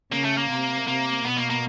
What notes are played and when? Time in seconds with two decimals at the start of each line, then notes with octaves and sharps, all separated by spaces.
0.12 C#3 A#3
0.24 A3
0.37 A#3
0.49 C3
0.87 C3 A#3
1.25 B2 B3
1.37 A#3
1.50 A#3